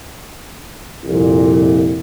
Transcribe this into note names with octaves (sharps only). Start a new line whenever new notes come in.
C2 F2 A#2